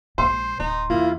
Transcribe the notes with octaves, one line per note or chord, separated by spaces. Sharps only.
A#1 G#3 C5 C6
D1 D#4
E2 A#3 E4 F4